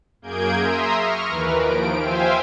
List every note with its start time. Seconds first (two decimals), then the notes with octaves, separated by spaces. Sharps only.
0.22 F#2 A#3 G#4 G6 G#6 D7
0.56 E5 A#5 C6 D#6
0.96 C#6 F6 A#6
1.29 D#2 E3 A#4 B4
1.57 D#2 F3 D7
1.98 C5 E5 F5 G5 G#5